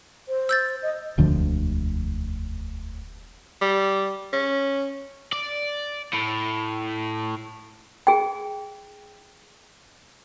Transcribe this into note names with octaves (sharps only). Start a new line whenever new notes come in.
C5
E6 G6 A6
D#5
E1 D2 D3 F3
G3
C#4
D5
A2
G#4 G5